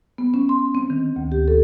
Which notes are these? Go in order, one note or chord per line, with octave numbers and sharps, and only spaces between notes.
B3
C#4
C6
C4
D#3
D2
G4
A4